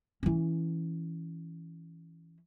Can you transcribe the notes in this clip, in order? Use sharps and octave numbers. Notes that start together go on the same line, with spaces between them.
E3 C#4